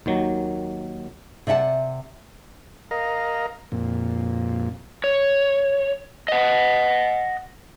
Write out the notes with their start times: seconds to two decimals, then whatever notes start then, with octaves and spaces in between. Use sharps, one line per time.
0.06 D#2 D#3 F#3
1.47 C3 D5 E5 F#5 A5
2.91 A#4 D#5 F5 A#5
3.72 F2 A#2
5.04 C#5
6.28 D#5 F#5